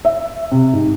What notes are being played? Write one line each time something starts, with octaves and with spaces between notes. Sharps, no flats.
E5
C3
G#2